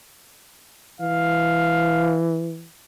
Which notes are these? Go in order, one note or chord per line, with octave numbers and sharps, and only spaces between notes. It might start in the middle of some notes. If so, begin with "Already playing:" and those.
E3 F5